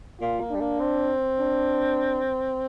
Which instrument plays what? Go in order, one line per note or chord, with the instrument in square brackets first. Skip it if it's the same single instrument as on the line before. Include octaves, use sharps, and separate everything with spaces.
[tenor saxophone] A#2 [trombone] F4
[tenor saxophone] A#3
[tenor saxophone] G3 [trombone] D4
[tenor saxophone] A#3
C4
[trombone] D4